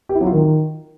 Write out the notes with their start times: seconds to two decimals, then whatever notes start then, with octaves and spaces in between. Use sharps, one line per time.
0.09 G4
0.15 E4
0.21 F#3
0.27 F4
0.32 D#3